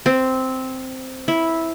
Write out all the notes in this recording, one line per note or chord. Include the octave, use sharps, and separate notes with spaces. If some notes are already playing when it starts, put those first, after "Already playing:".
C4
E4